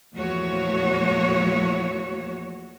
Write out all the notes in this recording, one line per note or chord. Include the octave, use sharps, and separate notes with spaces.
E2 A#2 F3 A3 F#4 C#5